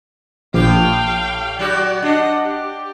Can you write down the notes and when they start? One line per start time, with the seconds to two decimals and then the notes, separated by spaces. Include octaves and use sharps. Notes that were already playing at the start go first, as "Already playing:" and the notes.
0.54 A#1 A2 G4 F5 G5
1.59 F#3 F#4 G4 D5
2.02 D4 D#5 F#5
2.45 G4